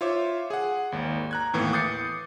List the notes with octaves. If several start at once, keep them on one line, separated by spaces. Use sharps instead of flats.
F4 C5 C#5 E5 D6
G#4 F#5
G#1 D#2
A#5 F#6 G#6
D#2 A2 E3 B3
D6 D#6 G6 A6 C7 C#7